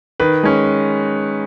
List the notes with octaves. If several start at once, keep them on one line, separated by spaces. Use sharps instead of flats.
D#3 B4
G#3 C#4